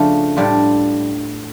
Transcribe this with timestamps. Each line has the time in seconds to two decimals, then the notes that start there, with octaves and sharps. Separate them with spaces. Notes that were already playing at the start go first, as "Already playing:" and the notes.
Already playing: C#3 F3 A3 D4 F4
0.37 A2 G3 D4 F4